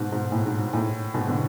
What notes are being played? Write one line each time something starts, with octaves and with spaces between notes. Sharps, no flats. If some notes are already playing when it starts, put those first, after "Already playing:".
Already playing: G#2 B2
G#2
A2
G#2
G#2
A2
G#2 B2
B2 D3